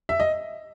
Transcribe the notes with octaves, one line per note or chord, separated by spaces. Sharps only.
E5
D#5